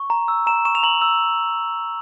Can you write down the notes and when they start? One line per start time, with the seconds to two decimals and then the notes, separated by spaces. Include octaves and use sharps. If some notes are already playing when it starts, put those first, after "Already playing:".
Already playing: C#6
0.10 A#5
0.28 E6
0.47 A#5 E7
0.65 C#6 E7
0.75 F7
0.83 A#5 F#7
1.02 E6